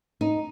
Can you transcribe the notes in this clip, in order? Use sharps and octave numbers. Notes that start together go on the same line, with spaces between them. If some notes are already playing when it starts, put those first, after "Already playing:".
D#4